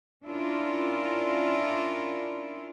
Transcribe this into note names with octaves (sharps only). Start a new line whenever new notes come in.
C#4 D4 E4 F4 A#4